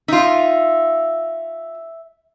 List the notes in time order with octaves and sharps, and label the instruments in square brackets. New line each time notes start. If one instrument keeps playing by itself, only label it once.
[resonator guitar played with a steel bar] D#4 F4 [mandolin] E5